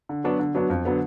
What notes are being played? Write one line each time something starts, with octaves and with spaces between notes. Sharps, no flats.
D3
F#3 B3 D4 F#4
D3
F#3 B3 D4 F#4
F2
D3 F#3 B3